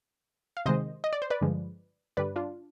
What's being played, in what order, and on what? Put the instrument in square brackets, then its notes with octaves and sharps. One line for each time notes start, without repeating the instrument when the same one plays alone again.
[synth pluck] F5
C3 D#3 G#3 C5 D#5
D#5
D5
C5
B4 D5
G2 D3 F3 G#3
G2 D3 G3 B4 D5
D4 F4